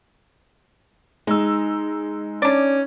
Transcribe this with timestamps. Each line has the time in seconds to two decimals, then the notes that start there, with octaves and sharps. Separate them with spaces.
1.27 G#3 D#4 E6
2.42 C#4 D4 D5